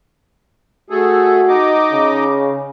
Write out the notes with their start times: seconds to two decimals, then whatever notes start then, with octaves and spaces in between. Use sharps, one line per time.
0.90 A3 F#4 G#4 A4
1.48 D#4 D#5 D6
1.92 C#3